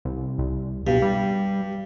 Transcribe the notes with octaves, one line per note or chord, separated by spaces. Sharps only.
C2
C2
G2 B2
G3